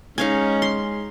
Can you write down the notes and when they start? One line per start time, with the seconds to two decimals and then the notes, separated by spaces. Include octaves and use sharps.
0.18 G#3 C#4 D#4 F5 G#5
0.62 C6